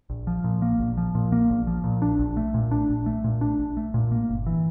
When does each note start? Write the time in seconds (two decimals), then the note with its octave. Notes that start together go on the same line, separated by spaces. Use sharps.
0.10 A#1
0.27 F3
0.44 A#2
0.62 A#3
0.79 A#1
0.97 F3
1.15 A#2
1.32 A#3
1.50 A#1
1.67 F3
1.84 A#2
2.02 D4
2.19 A#1
2.37 A3
2.54 A#2
2.71 D4
2.89 A#1
3.06 A3
3.24 A#2
3.41 D4
3.59 A#1
3.77 A3
3.94 A#2
4.12 A#3
4.29 G1
4.46 E3